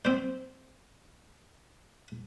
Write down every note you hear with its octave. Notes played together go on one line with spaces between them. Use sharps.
C4 C5